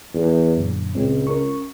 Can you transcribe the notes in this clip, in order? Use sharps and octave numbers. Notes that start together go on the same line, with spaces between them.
E2
F#2 A#2 D3
C#2 A#2 G#3 C4
C#4 A#4 C#6